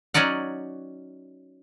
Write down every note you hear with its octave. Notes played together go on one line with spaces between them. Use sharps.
F#3 C#4 D#4 D5 F#5